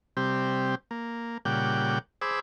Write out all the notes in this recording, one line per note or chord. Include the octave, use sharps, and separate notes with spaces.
C3 G3 C4 G4
A#3
A#2 C#3 G3 F#5 G5 D6
G#4 C5 B5 D6 E6